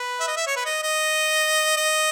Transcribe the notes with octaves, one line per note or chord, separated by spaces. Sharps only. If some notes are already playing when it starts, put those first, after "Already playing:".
Already playing: B4
E5
D#5
E5
C#5
B4
D#5
D#5
D#5